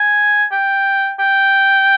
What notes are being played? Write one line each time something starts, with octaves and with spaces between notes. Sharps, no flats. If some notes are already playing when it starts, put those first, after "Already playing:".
Already playing: G#5
G5
G5